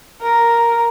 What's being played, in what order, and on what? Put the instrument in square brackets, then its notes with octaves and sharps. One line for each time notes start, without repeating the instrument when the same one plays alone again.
[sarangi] A#4